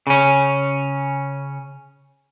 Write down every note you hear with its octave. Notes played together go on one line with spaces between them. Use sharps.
C#3 C#4